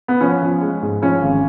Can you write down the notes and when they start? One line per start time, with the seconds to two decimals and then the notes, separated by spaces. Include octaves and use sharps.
0.08 B3
0.21 F3 C#4
0.42 F3
0.61 G#3
0.82 G#2
1.02 F3 C#4
1.22 G#1